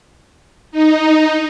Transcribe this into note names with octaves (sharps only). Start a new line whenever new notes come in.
D#4